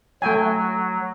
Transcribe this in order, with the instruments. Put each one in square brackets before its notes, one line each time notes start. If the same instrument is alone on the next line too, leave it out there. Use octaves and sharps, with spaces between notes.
[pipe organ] F#3 [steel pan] A3 G5 G#5